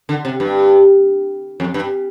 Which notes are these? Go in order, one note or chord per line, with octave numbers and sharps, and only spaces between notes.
D3
C3
G2
F2
G2